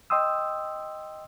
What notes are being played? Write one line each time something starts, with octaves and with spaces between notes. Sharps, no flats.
D#5 G5 C6 D#6 E6